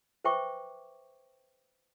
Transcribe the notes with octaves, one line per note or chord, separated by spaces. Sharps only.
B4 C5 E5 G5 C#6 D6